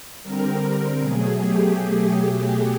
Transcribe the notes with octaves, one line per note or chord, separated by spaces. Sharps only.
D3 G3 C4 A#4
B2 F#3 A3 G#4
G4